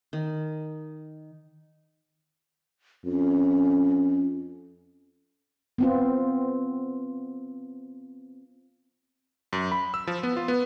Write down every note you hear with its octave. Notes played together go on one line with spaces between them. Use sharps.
D#3
F2 C#4
B3 C4 F4
F#2
B5
E6
F3
B3
F4
B3